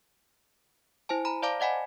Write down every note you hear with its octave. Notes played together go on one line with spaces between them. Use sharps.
E4 C5 G#5 A5
A#5 B5
C5 D5 F5 A5 A#5 D6
D5 D#5 F#5 G#5 B5